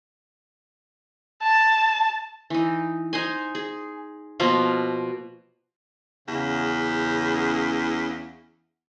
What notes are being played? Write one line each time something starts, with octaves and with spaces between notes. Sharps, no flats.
A5
E3 D#4
D#4 C5 G#5
G#4
B2 F3 A#3 F4
E2 C#3